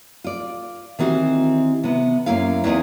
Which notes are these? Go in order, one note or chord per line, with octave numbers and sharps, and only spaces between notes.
F4 D5
D#3 E3 C4 F#4 G4
C3 B3
F#2 C3 F#3 A#3 E4 F5
E2 C4 D#4 D#5